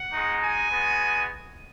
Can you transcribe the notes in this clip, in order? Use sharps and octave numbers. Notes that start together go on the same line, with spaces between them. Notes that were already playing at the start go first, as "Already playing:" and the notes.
Already playing: F#5
G#3 D#4 F#4
G#5
G#3 B3 F#4